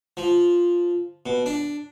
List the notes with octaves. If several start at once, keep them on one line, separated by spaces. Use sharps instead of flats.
F3
B2
D4